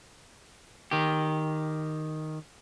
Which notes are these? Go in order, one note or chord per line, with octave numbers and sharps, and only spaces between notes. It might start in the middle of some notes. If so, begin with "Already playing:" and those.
D#3 G4